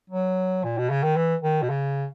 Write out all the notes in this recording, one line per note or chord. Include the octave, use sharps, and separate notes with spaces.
F#3
A#2
B2
C#3
D#3
E3
D#3
B2
C#3